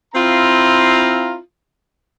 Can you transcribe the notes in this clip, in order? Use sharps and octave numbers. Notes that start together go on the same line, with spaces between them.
C4 E4 F4 F5 A#5